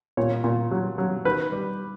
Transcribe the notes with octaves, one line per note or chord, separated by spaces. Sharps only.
A#2 C#5
A#2
F#3
F#3
D#3 B4
G3